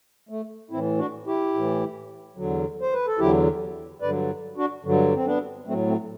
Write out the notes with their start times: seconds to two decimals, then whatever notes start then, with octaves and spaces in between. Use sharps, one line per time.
0.29 A3
0.71 A2 E3 C4 E4
0.98 D4 F#4
1.26 E4 G4
1.54 A2 E3
2.36 E2 D3 F#3
2.81 C5
2.93 B4
3.07 A4
3.18 E2 D3 F#3 E4 G4
4.02 G2 D3 F#3 B4 D5
4.57 D4 F#4
4.85 G2 D3 F#3
5.15 C4
5.26 B3 D4
5.67 A2 F#3 A3 C4
5.87 A3 C4